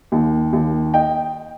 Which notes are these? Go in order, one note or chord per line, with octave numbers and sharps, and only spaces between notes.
D#2
D#2
D#5 G5